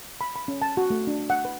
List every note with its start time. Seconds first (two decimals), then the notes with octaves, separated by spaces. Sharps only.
0.21 B5
0.36 B5
0.48 C#4
0.62 A5
0.77 F#4
0.90 A3
1.07 D4
1.30 F#5
1.45 B4